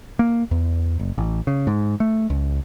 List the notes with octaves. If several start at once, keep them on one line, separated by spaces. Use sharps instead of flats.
A#3
E2
F#1
A1
C#3
G#2
A3
C#2